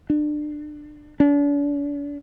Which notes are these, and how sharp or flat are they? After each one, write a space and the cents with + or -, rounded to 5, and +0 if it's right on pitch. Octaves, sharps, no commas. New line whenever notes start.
D4 +25
D4 -40